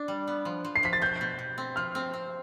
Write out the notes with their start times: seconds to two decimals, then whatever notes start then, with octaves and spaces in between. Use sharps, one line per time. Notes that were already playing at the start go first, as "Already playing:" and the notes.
Already playing: D4
0.08 G3
0.28 B3
0.45 F3
0.65 F3
0.76 C7
0.83 F3 B6
0.93 A6
1.02 B2 G6
1.21 B2
1.39 B2
1.58 C4
1.76 F3 F6
1.95 C4
2.14 C4